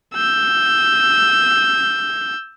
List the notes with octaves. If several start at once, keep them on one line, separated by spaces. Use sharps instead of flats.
E6 G6